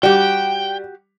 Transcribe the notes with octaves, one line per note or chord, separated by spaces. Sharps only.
G3 F#4 G4 G5